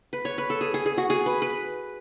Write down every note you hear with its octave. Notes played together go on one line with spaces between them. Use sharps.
B4
C#5
B4
A4
G#4
G#4
G#4
F#4
G#4
B4
B4